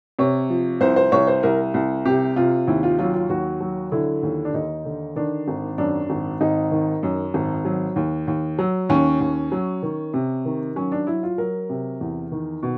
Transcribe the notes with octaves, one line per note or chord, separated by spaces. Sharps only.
C3 C#5
F3
C2 C5
C5
C2 C#5
C5
C2 A#4
C2
C3 G4
C3 F4
D#2 E4
F4
F#3 F4
F4
D#2 F#4
F#3
D3 E4
D#2
D4
D#2 D#4
D3
D#3 D4
G#1
F#2 D4
G#1
G#1 D#4
D#3
F#2
G#1
F#3
D#2
D#2
F#3
D#2 C#4
D#2
F#3
D#3
C3
D#3
F#3 C#4
D4
F#3 E4
F4
F#3 A#4
C3
E2
D#3
B2